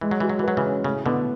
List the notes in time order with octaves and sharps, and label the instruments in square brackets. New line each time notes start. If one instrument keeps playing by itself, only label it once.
[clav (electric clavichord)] E3 [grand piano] G#3
[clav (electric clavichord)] F#3
[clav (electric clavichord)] E3 [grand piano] F#4
[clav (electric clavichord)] F#3
E3
[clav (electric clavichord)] F#3 [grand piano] B4
[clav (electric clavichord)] C#3 E3
[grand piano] C#4
[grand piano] A2 [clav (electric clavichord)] C#3
[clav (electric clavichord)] B2 D3 [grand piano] B3